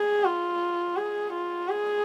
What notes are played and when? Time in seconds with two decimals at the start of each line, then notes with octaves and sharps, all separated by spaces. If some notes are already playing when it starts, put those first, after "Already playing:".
Already playing: G#4
0.24 F4
0.96 G#4
1.33 F4
1.69 G#4